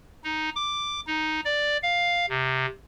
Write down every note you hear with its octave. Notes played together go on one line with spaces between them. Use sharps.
D#4
D6
D#4
D5
F5
C3